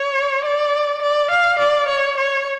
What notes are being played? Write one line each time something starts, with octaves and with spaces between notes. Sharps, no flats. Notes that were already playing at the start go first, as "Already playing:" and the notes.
Already playing: C#5
D5
D5
F5
D5
C#5
C#5